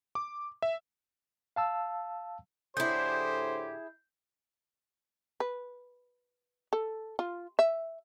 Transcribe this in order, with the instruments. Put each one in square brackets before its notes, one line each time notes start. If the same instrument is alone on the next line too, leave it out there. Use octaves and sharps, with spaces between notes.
[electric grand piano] D6
E5
[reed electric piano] F5 A5 E6
[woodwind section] A2 D3 G4 [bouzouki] E4 G#4 [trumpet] C5 [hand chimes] G6
[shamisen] B4
A4
F4
E5